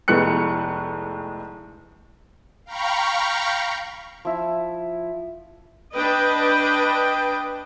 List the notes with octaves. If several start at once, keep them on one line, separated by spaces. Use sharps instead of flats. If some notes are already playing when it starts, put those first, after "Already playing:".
F1 A2 G#3 B3 F#6 C#7
F5 G5 A#5 B5 C#6
F3 E4
D4 B4 D#5 G5